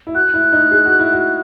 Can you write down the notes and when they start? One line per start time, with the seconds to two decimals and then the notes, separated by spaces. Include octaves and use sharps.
0.07 E4
0.15 F#4 F#6
0.34 E4
0.52 D#4
0.71 G#4
0.86 F#4
0.99 E4
1.13 F#4